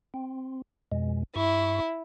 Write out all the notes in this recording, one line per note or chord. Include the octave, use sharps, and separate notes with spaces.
C4
F2 B2 G#3
G2 E4 C#6